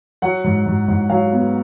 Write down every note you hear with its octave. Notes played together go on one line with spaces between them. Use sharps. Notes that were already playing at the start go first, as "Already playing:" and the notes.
F#3 F#5
G#2
G#2
G#2
F#3 F5
B3